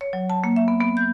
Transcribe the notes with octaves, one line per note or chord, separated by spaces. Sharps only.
C#5
F#3
A5
A#3
E5
B3
B3
G6